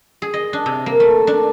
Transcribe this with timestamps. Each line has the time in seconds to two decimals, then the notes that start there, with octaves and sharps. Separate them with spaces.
0.22 G#4
0.34 D#5
0.53 D4
0.66 C3
0.86 A#3
1.00 A3
1.27 D4